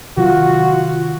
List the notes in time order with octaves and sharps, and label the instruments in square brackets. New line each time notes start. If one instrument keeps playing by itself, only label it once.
[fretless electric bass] C3 D#3 F#3 [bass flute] F4 [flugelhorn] F#4